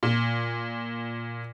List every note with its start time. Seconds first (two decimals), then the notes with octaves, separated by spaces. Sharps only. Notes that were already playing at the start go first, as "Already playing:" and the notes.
0.03 A#2